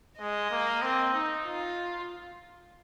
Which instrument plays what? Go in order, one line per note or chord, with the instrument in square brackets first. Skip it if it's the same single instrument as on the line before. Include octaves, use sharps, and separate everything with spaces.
[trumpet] G#3 [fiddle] D#5
[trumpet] A#3
C4
D#4
[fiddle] F4